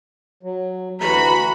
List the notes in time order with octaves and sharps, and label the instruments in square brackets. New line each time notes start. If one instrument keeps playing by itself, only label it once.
[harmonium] F#3
[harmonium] D2 E3 A#5 [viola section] F#4 B5